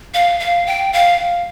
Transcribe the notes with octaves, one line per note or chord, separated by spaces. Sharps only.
F5
F5
G5
F5